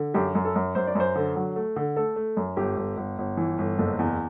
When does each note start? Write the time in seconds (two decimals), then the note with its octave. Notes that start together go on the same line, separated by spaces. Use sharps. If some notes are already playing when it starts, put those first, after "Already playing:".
Already playing: D3
0.14 F#2 G4
0.35 F#2
0.45 A4
0.55 F#2
0.75 F#2 C5
0.87 D5
0.95 F#2 C5
1.16 D3
1.36 F#3
1.56 A3
1.76 D3
1.96 A3 A4
2.16 A3
2.37 F#2
2.57 G1 G4
2.77 G1
2.97 G1
3.18 G1
3.37 E3
3.58 G1
3.78 F#1 A4
3.99 E2